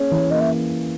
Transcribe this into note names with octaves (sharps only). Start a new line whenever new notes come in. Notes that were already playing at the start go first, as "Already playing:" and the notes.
Already playing: A#3 C#4 G#4 C#5
E3
A#3 D#5
E5